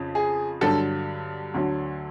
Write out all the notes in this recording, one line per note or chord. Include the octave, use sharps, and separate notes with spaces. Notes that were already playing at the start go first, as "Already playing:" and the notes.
Already playing: F2 C#3 F3
G#4
G2 D3 F#3 A4
D2 D3 F#3